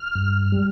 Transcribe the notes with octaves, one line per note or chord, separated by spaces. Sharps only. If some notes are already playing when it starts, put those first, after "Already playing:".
Already playing: F6
G2
G3